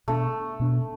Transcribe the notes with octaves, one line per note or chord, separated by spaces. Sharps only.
B2 A3 B3 D4
B2 B3 D4